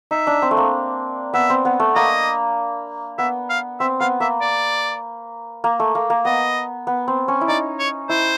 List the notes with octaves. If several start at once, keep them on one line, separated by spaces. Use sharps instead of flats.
D#4 E5
D4
C4
A3
A#3
B3 E5
C4
B3
A3
A#3 D#5
B3 E5
F5
C4 E5
B3 F5
A#3 E5
D5
A#3
A3
A#3
A#3
B3 D#5
B3
C4
C#4
E4
D#4 D5
C#5
E4 C5